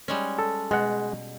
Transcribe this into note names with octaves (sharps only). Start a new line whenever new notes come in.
G3 G#3 C#4
A4
B2 G#3 F#5